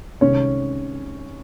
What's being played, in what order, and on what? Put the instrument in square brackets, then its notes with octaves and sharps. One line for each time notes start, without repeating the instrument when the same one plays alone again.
[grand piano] C2 C3 D#3 G#3 C#4 C#5